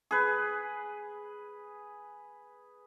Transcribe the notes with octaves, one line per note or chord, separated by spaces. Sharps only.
G#4 B4